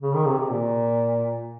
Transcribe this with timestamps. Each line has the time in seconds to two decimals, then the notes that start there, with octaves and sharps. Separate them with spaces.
0.02 C#3
0.14 D#3
0.27 C3
0.40 C3
0.51 A#2